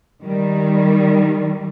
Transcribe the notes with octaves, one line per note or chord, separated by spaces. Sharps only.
D#3 G3